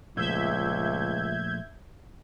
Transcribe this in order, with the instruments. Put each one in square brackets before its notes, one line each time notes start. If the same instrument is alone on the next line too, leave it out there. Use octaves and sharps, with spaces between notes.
[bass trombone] C#2 [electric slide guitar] A#2 F3 A3 [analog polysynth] E5 G6 G#6